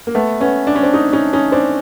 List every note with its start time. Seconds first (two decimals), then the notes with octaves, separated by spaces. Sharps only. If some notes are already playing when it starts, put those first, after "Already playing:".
0.07 A#3
0.14 A3 B3
0.41 B3 C#4
0.67 D4
0.75 C#4
0.83 C4 D4
0.94 C#4 D#4
1.13 C#4 D#4
1.33 C#4 D#4
1.52 C4 D4